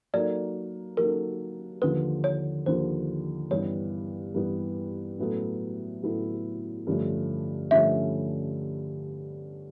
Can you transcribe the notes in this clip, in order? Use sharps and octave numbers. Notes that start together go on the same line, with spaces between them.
F#3 A#3 D#4 F#4 A4 D5
F#3 A#3 D#4 F#4 A4 A#4
D#2 D3 F3 B4
C#5
D#2 D3 F3 C5
G2 E3 G3 B3 C#5
G2 E3 G3 B3
A2 F#3 B3 E4 A4
A2 F#3 B3 E4 A4
G2 D3 F3 A3 C#4
G2 D3 F3 A3 C#4 E5